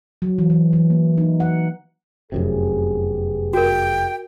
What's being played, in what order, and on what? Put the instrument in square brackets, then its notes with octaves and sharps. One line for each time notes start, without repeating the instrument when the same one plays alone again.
[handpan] F#3
E3
E3
E3
A#3
D#4
F#5
[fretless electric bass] F1 F#2 C3 [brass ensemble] B3 G4 G#4
[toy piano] F#4 A#4 [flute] G5